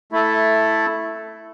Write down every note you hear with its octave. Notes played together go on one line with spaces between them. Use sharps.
A3 E4 A4